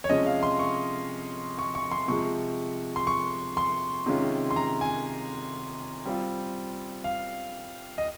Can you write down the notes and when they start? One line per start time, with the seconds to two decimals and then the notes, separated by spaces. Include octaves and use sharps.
0.04 C#5
0.09 C3 F3 G#3 C#4 D#5
0.26 F5
0.43 C6
0.59 C#6
1.59 C#6
1.75 C#6
1.92 C6
2.08 C3 F3 G#3 C#6
2.96 C6
3.07 C#6
3.57 C6
4.06 C3 D#3 G#3 C#4 F4
4.51 C6
4.56 A#5
4.81 G#5
6.05 G3 C4 F4
7.04 F5
7.98 D#5